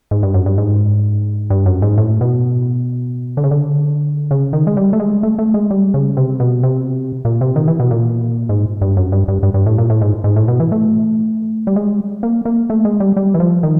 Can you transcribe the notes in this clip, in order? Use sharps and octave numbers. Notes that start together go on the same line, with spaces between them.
G#2
G2
F#2
G2
G#2
G2
F#2
G#2
A2
B2
D3
C#3
D3
C#3
D#3
G#3
G3
A3
G#3
A3
A3
G#3
G3
C#3
C3
B2
C3
A#2
C3
D#3
E3
B2
A#2
G#2
G2
F#2
G2
G2
G2
G2
A2
A#2
A2
G#2
G#2
A2
B2
E3
A3
G3
G#3
A#3
A#3
A3
G#3
G3
G3
E3
F3
D#3